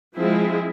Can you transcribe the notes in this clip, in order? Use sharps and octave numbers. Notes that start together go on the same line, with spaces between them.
F3 G#3 C4 E4 G#4